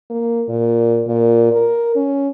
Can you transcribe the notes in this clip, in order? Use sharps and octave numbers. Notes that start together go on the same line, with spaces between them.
A#3
A#2
A#2
A#4
C#4